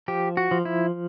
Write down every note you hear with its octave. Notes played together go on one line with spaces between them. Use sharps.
F3 G4
F#4
F3
E4